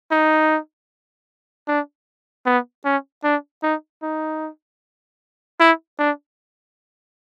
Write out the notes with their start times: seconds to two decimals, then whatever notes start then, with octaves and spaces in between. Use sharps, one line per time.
0.11 D#4
1.68 D4
2.46 B3
2.85 C#4
3.24 D4
3.63 D#4
4.02 D#4
5.60 E4
5.99 D4